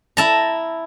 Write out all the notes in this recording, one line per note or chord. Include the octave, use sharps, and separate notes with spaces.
E4 A5 A#5